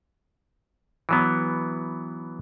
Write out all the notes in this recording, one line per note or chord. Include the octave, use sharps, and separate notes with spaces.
E3 F#3 B3